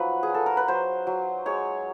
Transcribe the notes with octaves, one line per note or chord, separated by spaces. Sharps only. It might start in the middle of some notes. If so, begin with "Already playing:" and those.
Already playing: F3 F#3 D#4 B4
G#4
F#3 A4
A#4
B4
F#3 C5
F#3
G#3 C#5